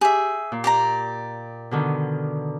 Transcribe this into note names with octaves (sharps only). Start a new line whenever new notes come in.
G4 G#4 E5
A#2
G4 D5 A#5
B2 D3 D#3